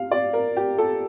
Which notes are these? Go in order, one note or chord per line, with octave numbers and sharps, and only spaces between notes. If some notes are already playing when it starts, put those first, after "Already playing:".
Already playing: F5
D5
A#4
G4
A4